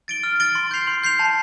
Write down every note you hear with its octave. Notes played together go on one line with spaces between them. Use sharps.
A6 D7 G7
F6
A6 D7 G7
C6
G6 C7 F7
C6
G6 C7 F7
A5